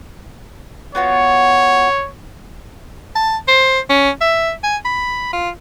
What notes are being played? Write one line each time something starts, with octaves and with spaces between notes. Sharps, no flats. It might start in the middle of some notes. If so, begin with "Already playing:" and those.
B3 F4 F#4 C#5
A5
C5
C#4
E5
G#5
B5
F4